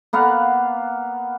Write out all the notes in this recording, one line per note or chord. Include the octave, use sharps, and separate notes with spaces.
A#3 B3 F5 F#5